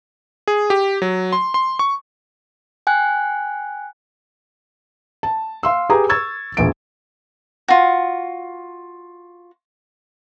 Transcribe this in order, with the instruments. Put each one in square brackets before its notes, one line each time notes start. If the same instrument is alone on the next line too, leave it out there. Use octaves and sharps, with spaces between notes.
[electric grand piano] G#4
G4
F#3
C6
C6
C#6
[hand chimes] G5 G#5 F#6
[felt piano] A5
F5 C6 E6
G4 G#4 B4 A#5
C#6 E6 G#6 A6
E1 A#1 D7
[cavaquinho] F4 F#4